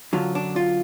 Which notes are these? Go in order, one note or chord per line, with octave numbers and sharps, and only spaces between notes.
F#2 D3 F#3 F4
D4
F4